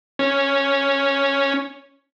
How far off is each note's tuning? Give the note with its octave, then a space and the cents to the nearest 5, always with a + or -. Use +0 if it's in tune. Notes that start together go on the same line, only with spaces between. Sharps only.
C#4 +0